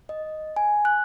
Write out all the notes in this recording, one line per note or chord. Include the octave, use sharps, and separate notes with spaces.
D#5
G#5
F#6